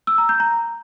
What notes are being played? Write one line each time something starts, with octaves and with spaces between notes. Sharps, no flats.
E6
A#5
G6
A#5